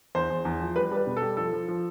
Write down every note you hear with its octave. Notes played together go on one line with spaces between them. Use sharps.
E2 C5
E2
E2
F3
G3 B4
G3 B4
B2
A4
G3
F3 A4
F3
F3